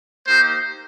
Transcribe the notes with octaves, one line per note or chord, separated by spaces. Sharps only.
A#3 D#4 G4 C5